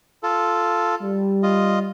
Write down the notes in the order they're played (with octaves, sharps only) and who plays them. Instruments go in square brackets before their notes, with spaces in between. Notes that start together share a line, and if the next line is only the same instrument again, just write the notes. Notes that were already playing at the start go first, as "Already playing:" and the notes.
[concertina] F4 A4
[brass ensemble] G3
[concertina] F4 D#5